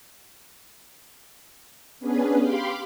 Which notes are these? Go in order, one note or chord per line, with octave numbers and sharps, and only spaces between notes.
B3 C#4 D4 G#4 B4
G4 F5 B5 C6 D6